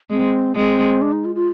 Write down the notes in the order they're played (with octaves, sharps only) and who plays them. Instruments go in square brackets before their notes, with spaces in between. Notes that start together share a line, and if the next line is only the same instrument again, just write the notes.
[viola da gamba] G#3 [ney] C4
[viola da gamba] G#3 [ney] C4
[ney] D4
D#4
F4
F4